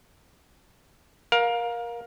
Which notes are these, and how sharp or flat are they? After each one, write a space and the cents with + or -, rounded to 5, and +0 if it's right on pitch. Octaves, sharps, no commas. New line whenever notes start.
A#4 +20 F5 +20